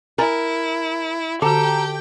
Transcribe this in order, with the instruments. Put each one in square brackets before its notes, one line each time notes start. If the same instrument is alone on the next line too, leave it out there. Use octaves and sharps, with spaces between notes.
[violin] E4 [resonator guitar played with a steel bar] A#4 [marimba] G#5 A#5 A6
[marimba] D3 F#4 [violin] G4 G5 [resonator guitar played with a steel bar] A4 [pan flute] A#5